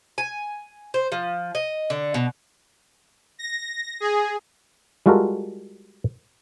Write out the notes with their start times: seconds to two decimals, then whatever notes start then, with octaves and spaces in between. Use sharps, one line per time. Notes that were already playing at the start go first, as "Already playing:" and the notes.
0.18 G#5
0.94 C5
1.12 F3
1.55 D#5
1.90 D3
2.14 B2
3.39 A#6
4.00 G#4
5.06 G3 G#3 F4 F#4 A4 A#4